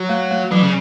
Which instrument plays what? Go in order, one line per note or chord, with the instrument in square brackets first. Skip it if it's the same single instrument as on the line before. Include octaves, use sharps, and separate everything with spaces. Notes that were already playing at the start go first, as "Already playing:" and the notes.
Already playing: [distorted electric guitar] F#3
[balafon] A3
A3
[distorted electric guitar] E3 [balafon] F#3
[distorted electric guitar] C#3